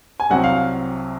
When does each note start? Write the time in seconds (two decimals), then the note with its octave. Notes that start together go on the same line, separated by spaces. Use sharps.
0.20 G#5
0.30 C2 C3 F#3 C4 F#5
0.44 F5